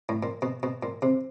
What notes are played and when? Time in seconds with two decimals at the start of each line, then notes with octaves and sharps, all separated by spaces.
0.09 A2
0.23 A#2
0.42 B2
0.63 B2
0.83 A#2
1.02 C3